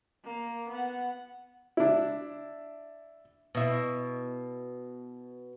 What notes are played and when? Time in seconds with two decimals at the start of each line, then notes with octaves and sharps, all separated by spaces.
0.24 A#3
0.68 B3 F#5
1.77 D4 E4
3.55 B2 E4